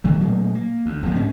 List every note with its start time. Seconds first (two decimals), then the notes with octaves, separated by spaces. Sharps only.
0.04 A2 D#3 F#3
0.21 A#2 F#3 A3 A#3
0.55 A#3
0.86 D2
1.03 E1 B1 F3 A#3
1.15 G#2 C4 C#4